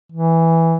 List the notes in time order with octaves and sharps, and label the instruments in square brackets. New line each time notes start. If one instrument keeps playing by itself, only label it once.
[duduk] E3